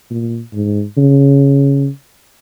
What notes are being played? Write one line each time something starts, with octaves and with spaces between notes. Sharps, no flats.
A#2
G#2
C#3